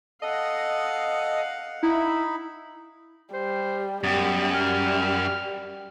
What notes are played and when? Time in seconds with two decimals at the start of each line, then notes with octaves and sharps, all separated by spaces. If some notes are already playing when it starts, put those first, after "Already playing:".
0.22 A4 D#5 F5 F#5
1.83 D#4 E4 B5
3.33 G3 C5
4.04 F#2 G3 B3
4.54 G3 F6